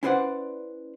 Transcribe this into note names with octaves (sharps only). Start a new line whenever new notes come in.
C#4 E4 B4 C5 D5 F#5